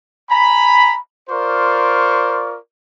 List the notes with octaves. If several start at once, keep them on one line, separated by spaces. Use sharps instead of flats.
G#5 A#5 B5
F4 A#4 C5 D5 C#6